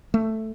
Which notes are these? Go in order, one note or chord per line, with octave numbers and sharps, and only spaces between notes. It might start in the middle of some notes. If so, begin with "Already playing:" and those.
A3